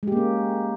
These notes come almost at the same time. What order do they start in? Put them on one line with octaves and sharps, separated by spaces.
G#3 G4 A#3 C#4